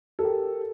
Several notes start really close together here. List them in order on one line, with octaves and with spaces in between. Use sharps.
A4 A#4 G4